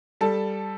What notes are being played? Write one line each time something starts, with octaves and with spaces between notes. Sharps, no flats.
G3 A4 A5